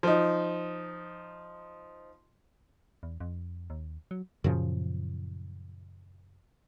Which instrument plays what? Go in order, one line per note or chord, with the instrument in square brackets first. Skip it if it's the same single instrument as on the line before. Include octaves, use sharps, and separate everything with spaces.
[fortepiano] F3 D#4
[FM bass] E2
F2
D#2
F#3
[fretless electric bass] F#2 A#2 C#3 F3